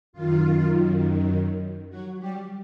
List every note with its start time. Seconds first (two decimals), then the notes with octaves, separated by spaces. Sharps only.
0.13 F#2 D#3 F4
1.90 F#3 F#4
2.19 G3 G4